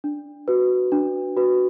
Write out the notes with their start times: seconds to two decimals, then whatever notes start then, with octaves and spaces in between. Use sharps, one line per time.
0.04 D4
0.48 F#4 B4
0.92 D4
1.37 F#4 B4